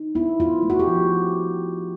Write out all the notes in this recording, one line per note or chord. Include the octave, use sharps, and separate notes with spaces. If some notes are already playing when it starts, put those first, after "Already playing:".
Already playing: D#4
B3 E4
B3 F4
A3
F#4
G4
F3